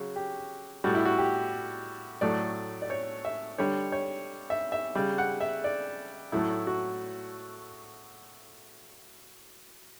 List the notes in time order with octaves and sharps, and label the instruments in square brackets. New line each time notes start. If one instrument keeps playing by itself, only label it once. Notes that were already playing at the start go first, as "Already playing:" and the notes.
Already playing: [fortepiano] C#3 F#3
G4
A2 G3 F#4
E4
F#4
G4
A2 F#3 A3 D5
D5
C#5
E5
D3 G3 C#5
C#5
E5
E5
C#3 G3
F#5
E5
D5
A2 F#3 A3 E4
F#4